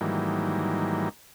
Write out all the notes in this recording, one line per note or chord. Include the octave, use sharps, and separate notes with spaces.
G#2 D#3 E3 F#3 G3 A#3